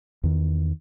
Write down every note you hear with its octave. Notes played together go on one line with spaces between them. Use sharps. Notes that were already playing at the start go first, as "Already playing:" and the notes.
E2 D#3